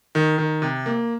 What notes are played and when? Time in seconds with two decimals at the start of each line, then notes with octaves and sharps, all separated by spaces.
0.15 D#3
0.38 D#3
0.62 C3
0.86 A#3